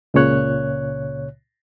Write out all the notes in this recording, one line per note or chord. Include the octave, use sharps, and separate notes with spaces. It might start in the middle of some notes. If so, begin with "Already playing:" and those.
C#2 A#2 C#3 C#5 F#6